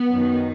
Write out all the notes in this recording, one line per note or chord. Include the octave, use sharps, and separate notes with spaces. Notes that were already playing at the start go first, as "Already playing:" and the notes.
Already playing: B3
F#2 D#3